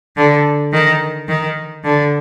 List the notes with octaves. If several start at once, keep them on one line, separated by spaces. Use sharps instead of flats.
D3
D#3
D#3
D3